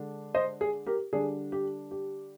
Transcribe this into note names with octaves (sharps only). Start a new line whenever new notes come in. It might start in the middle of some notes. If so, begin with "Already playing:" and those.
Already playing: D3 G#3 D4
C5 D#5
G#4
G4 A#4
D3 G3 D4 G#4
G4
G4